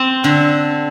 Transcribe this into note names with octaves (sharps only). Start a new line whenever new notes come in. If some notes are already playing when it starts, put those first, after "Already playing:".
Already playing: C4
D3